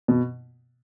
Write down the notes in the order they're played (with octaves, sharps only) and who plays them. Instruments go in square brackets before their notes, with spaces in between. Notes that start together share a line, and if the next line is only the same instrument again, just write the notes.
[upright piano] B2